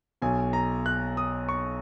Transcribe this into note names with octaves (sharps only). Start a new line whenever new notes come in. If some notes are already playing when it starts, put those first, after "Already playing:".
B1 B2 G#5
A#5
F#6
D#6
C#6